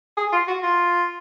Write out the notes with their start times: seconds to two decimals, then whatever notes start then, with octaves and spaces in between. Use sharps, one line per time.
0.17 G#4
0.32 F4
0.48 F#4
0.63 F4